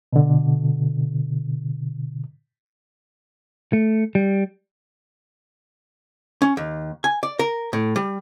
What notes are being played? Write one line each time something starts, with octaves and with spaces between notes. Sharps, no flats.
B2 D3
A3
G3
C#4
D#2
G#5
D5
A#4
A2
G3